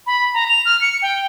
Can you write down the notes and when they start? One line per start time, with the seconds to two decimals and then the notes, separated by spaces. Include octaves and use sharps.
0.07 B5
0.34 A#5
0.48 F7
0.66 F6
0.81 C#7
1.02 G5